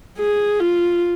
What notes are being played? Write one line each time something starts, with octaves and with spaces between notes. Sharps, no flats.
G#4
F4